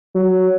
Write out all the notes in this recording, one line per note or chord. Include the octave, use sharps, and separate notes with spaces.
F#3